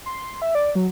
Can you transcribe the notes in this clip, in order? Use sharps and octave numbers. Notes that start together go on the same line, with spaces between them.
C6
E5
D5
F#3